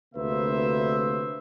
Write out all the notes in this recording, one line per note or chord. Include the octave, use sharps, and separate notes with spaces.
D2 C3 A#3 B4 C5 E5